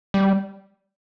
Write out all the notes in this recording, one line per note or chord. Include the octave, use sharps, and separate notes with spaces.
G3